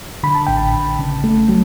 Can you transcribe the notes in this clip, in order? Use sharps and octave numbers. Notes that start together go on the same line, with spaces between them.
D3 B5
A5
A1 G5
A5
A1
C#3
A3
F#3